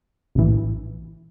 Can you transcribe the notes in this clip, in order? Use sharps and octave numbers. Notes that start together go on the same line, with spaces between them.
A#1 A2 E3